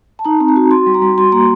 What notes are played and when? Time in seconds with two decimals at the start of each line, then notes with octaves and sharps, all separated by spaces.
0.19 A5
0.25 D#4 A#5
0.40 C4
0.48 A#5
0.56 F#4
0.71 F#4 C6
0.87 G3
0.94 A#5
1.02 G3
1.18 F#4 C6
1.32 A#3 A#5